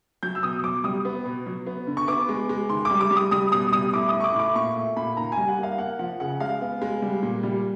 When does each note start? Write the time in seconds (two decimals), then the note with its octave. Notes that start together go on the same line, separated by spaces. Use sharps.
0.23 F#3 G6
0.35 E6
0.43 B2 D#6
0.64 F#3 D6
0.84 G3 D#6
1.05 B3
1.26 B2
1.46 F#3
1.67 B3
1.87 D3
1.97 C#6
2.08 B3 D6
2.29 G#3
2.49 G#3
2.69 D#3 C6
2.85 D6
2.91 G3
3.01 D6
3.11 G3
3.16 D#6
3.31 G3 D#6
3.52 B2 D#6
3.73 G3 D#6
3.93 A2 D6
4.09 D#6
4.14 A2
4.20 C#6
4.24 D6
4.34 A2
4.39 D6
4.55 A#2 C#6
4.76 A3
4.97 A#2 B5
5.17 D#3 A#5
5.32 G#5
5.37 G3
5.48 F#5
5.59 A#3 F5
5.78 A#3 F#5
5.99 F3 F#5
6.20 C#3 F#5
6.40 G#3 F5
6.61 B3
6.82 G#3
7.02 G3
7.23 A#2
7.43 G3